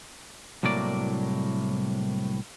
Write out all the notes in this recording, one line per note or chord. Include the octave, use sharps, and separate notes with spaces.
C2 A2 F#3 A#3 D5